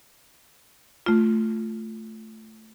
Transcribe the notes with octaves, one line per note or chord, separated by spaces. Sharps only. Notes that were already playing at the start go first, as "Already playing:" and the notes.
A3 F4